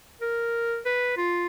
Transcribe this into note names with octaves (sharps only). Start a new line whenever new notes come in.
A#4
B4
F4